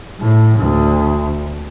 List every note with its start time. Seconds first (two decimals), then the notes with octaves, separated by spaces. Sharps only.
0.20 A2
0.59 D2